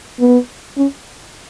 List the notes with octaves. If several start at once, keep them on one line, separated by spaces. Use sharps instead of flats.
B3
C#4